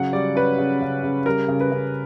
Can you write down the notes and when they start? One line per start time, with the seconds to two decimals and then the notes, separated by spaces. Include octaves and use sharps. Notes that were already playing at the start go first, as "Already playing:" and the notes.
Already playing: C#3 F#3 F#5
0.13 G3 D5
0.36 C#4 B4
0.58 C#3
0.82 C#3
1.03 C#3
1.26 G3 A#4
1.48 C#3
1.60 B4
1.72 C#3